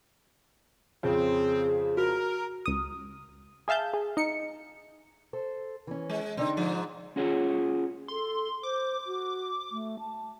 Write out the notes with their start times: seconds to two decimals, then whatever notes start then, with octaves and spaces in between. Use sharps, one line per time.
1.03 F2 C#3 C4 G#4
1.97 F#4 A#4
2.66 C#2 D#6
3.68 G#4 E5 F5 A5 G6
3.94 G#4
4.17 D#4 C#7
5.33 A4 C5
5.87 E3 C#4
6.10 G#3
6.37 D3 C4 D4 D#4
6.57 G#2 F3
7.16 C#4 F4 F#4 G#4 C#5
8.08 A4 C6
8.63 C5 D6
9.07 F#4
9.72 A3
9.99 A5